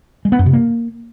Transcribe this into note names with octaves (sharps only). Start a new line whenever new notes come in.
G#3
B3
F#2
C3
A#3